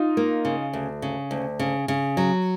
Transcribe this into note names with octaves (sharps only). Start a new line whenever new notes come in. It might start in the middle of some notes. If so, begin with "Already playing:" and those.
Already playing: D#4 F4
A#3
C#3
D2
C#3
D2
C#3
C#3
F#3